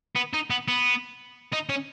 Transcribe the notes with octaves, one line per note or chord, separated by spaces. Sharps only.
B3
D#4
B3
B3
D#4
C#4